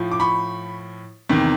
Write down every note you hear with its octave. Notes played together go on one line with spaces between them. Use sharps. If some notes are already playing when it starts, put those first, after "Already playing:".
Already playing: A2 F3
D6
B5 C#6
E2 C3 D#3